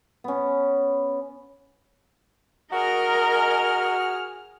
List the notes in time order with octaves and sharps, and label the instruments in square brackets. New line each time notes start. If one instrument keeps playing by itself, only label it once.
[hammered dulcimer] B3 C#4
[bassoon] F#4 [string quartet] G#4 F6 [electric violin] A#4 D#5